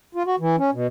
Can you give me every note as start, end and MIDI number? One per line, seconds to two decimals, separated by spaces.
0.15 0.23 65
0.26 0.36 66
0.39 0.56 52
0.57 0.70 61
0.73 0.87 47